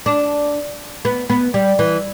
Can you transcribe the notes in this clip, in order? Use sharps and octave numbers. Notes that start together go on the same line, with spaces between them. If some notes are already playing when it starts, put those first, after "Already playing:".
D4
B3
B3
G3
E3